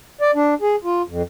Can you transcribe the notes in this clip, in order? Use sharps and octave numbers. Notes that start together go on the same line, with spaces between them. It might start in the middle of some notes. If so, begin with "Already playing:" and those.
D5
D4
G#4
F4
F2